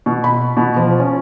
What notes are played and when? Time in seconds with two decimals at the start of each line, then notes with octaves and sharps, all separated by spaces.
0.06 B2
0.24 B5
0.57 B2
0.76 F3
0.99 C#4